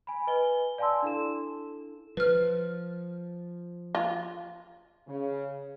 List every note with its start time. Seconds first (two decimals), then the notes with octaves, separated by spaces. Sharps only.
0.07 G#5 B5
0.27 B4 D#5 G#5 G7
0.78 D5 F5 G#5 A5 C6 E6
1.02 D4 E4 A4 E7
2.17 F3 B4 F6
3.95 F4
5.07 C#3